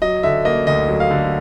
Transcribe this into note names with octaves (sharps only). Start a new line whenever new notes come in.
F#3 D#5
D3 E5
A#3 D#5
D2 D#5
F#3
F5
D3